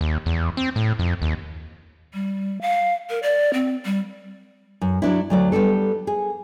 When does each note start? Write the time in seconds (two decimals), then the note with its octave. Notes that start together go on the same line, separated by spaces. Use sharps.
0.01 D#2
0.26 E2
0.57 C4
0.76 A2
0.99 F2
1.22 D#2
2.14 G3
2.61 F5
3.10 A#4
3.23 D5
3.54 C4
3.85 G3
4.81 F#2
5.02 F#3 D4 E4
5.30 D2 F#3 D5
5.52 G3 B3 D4 A4
6.07 G#4